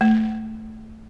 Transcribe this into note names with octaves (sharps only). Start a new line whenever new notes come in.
A3